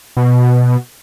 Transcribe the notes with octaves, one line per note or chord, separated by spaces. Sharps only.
B2